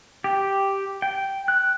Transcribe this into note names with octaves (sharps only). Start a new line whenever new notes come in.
G4
G5
F#6